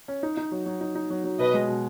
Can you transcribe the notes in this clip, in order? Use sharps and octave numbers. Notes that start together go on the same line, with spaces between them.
C#4
D#4
D#4
F#3
F#3
D#4
D#4
F#3
F#3
B2 B4 D#5
G#3
B2